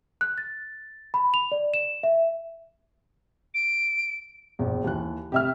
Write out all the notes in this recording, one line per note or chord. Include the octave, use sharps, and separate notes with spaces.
F#6
A6
B5
F7
D5
E7
E5
D7
A#1 E2
D#2 E3 F#6
C3 G4 E5 F6